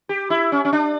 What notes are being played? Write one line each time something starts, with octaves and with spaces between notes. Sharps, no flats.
G4
E4
C#4
C#4
D4